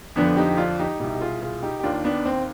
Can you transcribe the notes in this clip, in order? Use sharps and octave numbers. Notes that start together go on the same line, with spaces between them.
F2 D3 F3 B3 D4
D#4 G4
D4 F4
D#4 G4
C2 B2 D#4 G4
G4
F4 G#4
F4 G#4
D#4 G4
G4
D#2 D#3 D4 F4
B3 D4
C4